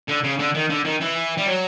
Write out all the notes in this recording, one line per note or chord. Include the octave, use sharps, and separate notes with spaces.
D3
C#3
D3
D#3
D3
D#3
E3
G3
F#3